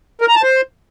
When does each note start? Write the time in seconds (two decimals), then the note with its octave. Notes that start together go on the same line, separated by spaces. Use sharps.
0.21 A#4
0.28 A#5
0.36 A5
0.43 C5